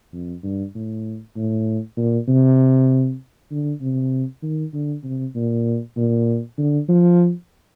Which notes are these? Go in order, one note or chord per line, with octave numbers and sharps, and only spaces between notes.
F2
G2
A2
A2
A#2
C3
D3
C3
D#3
D3
C3
A#2
A#2
D3
F3